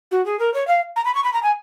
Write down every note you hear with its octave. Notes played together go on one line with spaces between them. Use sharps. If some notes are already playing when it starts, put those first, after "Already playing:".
F#4
G#4
A#4
C#5
F5
A#5
B5
C#6
B5
A#5
G#5